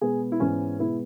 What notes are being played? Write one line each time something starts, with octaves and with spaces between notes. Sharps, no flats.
B2 G#3 B3 G#4
E4
G#2 E3 B3 C#4
B2 G#3 B3 E4